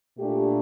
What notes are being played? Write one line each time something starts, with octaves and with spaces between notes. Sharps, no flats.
A#2 A3 D4 G4